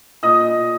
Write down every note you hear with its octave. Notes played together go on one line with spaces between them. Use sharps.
A#2 D#5 D#6